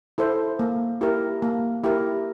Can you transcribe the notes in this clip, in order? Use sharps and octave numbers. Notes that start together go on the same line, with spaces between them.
E4 A4 C5
A#3
E4 G4 A#4
A#3
E4 G4 A#4